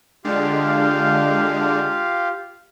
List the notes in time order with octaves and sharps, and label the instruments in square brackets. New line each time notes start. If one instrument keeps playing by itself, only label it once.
[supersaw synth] D3 G#3 D4 [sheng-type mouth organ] F4 G4 F5